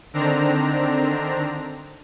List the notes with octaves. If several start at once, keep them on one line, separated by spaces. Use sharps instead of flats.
D3 D#3 C4 D4 A#5